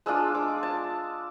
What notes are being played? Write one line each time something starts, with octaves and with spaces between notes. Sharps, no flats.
G#3 D4 F4 E6
D6
A5